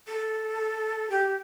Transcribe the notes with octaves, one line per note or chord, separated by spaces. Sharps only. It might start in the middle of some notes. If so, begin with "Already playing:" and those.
A4
G4